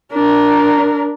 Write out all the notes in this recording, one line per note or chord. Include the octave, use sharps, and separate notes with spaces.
D4 A#4